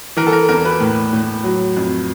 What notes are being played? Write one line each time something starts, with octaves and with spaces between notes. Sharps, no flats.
E3 A#4
A4
A#4
E2 A#4
B4
A2
A2
F#3
F2